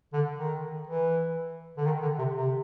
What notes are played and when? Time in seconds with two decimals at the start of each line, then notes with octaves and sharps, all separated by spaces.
0.13 D3
0.38 D#3
0.87 E3
1.77 D3
1.85 D#3
2.02 D3
2.19 C3
2.35 C3